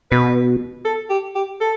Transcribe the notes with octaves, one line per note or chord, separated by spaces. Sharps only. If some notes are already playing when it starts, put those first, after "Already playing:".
B2 B4
A4
G4
G4
A4